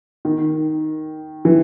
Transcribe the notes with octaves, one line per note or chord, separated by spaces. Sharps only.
D#3
E3